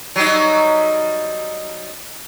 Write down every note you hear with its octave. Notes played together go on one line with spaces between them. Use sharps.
F#3 G3 D#4